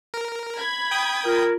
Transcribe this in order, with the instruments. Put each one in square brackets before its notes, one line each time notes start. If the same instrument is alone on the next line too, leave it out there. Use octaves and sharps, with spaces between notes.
[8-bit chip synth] A#4
[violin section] B5 G#6
[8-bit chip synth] G5 D#6
[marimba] F4 [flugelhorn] A#4